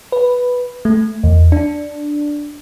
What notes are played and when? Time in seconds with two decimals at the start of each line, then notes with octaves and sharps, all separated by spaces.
0.12 B4
0.85 A3
1.23 E2
1.52 D4